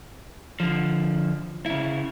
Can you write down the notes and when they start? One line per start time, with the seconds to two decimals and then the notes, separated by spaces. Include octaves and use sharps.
0.60 D3 F3
1.66 C#3 E4